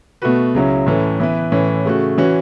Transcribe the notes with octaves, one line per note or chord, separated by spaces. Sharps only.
B2 A3 F#4 B4
C#2 C#3 F#3 C#4 E4
A2 E3 C#4 A4
E3 B3 E4 B4
A2 E3 C#4
C#3 A3 F#4
E3 C#4 F#4